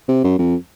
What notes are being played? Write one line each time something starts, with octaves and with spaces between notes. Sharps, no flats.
C3
F#2
F2